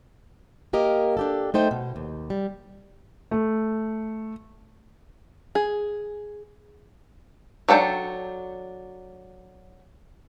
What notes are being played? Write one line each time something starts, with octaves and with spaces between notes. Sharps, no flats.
A#3 G4 A#4 D#5
D4 G4 A4
A3 D#4 C5 G5
B2
D#2
G3
A3
G#4
F#3 D4 A4 G5